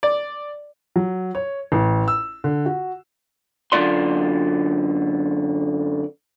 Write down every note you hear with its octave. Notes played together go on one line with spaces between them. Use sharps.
D5
F#3
C#5
A1
E6
D3
F#4
F#2 D3 F3 F4 D5 C6